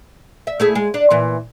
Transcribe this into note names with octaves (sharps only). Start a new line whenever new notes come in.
E5
A3 E4 G#4
G#3
D4
A#2 E3